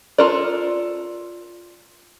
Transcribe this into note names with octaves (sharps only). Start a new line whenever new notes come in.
F4 A4 A#4 D5